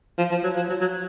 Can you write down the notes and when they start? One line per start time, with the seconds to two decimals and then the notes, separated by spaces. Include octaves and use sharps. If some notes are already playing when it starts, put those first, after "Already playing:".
0.18 F3
0.31 F3
0.43 F#3
0.56 F3
0.69 F#3
0.81 F#3